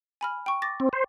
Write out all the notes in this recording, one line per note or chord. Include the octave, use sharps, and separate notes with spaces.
G#5 B5 F6
G5 C#6
D6 A6 A#6
C4
C5